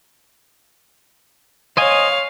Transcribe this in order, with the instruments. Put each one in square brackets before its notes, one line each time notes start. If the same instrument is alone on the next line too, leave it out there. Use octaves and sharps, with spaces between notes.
[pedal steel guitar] C5 D#5 G#5 [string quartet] C#5 F5